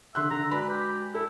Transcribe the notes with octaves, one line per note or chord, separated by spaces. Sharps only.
D3 E5 C6 F#6
D3 A#5
G#3 F#4 B4 D5 B5
G4
E4 A4